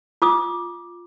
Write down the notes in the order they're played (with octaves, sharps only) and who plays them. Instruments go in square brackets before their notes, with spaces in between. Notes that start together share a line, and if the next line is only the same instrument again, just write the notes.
[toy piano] F4 D6 D#6